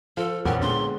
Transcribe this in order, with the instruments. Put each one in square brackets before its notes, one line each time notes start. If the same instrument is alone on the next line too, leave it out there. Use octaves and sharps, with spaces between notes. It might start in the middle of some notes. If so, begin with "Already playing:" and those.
[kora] F3 [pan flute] A4
[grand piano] A#1 [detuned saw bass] E2 [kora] B3 C#4 G4 [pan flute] A#4
[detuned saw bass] A#2 [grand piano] D3 G#3 [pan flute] C6